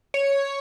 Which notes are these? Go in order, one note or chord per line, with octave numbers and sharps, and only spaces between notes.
C#5